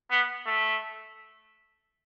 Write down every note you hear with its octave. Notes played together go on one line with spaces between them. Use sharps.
B3
A3